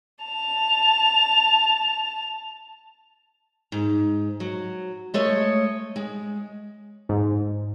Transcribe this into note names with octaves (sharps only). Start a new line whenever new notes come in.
A5 F7
G#2
F#3
G#3 A3 C#5 D#5
G#3
G#2